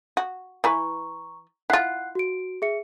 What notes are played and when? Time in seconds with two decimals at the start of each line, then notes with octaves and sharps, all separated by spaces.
0.17 F#4
0.64 E3 E4 B4 A#5 C#6
1.70 E4 F4 F#5 F#6 C7
2.15 F#4 D7
2.62 G#4 E5 C#7